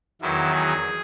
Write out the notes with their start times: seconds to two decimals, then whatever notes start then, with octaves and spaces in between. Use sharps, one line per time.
0.21 E2 D#3 F#3 E4
0.53 G#4